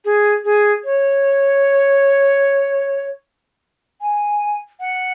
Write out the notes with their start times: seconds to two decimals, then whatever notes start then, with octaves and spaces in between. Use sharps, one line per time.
0.04 G#4
0.44 G#4
0.84 C#5
4.01 G#5
4.80 F#5